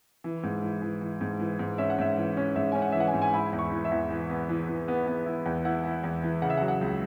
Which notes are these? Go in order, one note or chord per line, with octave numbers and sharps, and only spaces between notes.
E3
G#2
E3
E3
E3
G#2
E3
G#2
C#4 E5
F#5
G#2 E5
E3
C#4
G#2 E5
C#4 G#5
F#5
E3 E5
F#5
G#5
G#2
G#5
E4 B5
E2
C#6
E3
E5
E2
E3
B3
E3
E3
B3
B3
E4
E2
E4 F#5
E4
E2
E3
C#3 F#5
E5
F#5
F#3
F#5
C#2